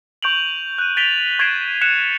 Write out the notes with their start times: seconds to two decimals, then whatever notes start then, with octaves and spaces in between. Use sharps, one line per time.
0.23 C#6 G6 D7 F7 F#7
0.78 F#6 D#7
0.97 A6 B6 D7 F7 G7
1.39 C#6 G#6 A6 C7 D7 E7
1.81 F#6 C#7 E7